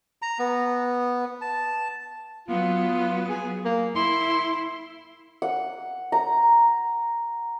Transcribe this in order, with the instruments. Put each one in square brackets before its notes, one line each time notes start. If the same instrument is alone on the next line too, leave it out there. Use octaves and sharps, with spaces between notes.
[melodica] A#5
B3
A5
[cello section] F#3 B3 [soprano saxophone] F4
[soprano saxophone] G#4
A#3
[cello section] E4 [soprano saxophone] C6
[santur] F#5
A#5